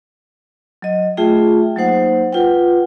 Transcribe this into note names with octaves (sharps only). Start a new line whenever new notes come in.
F#3 D#5
A3 F4 G#4 E5 G5
F#3 A#3 D#4 C5 F#5
F4 B4 F#5 G5